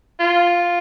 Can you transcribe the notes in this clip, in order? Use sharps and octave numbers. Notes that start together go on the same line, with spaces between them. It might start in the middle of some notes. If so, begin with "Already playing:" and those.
F4